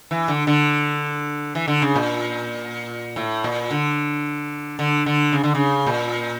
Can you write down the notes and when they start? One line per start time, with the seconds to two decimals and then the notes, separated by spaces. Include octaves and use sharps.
0.11 E3
0.28 D3
0.47 D3
1.55 E3
1.68 D3
1.82 C#3
1.96 A#2
3.16 A2
3.44 A#2
3.71 D3
4.79 D3
5.06 D3
5.33 C#3
5.44 D3
5.55 C#3
5.86 A#2